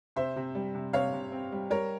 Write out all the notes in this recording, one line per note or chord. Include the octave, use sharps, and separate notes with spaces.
C3 C5 E5
C3
G3
C3
C3 C#5 F5
C3
C4
G3
G3 A#4 C#5